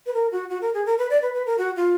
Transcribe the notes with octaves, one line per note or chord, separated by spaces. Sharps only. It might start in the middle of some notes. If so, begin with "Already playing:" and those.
B4
A#4
F#4
F#4
A#4
G#4
A#4
B4
D5
B4
B4
A#4
F#4
F4